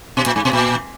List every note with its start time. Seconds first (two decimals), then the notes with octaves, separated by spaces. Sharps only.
0.17 B2
0.26 A#2
0.36 G#2
0.45 B2
0.53 A#2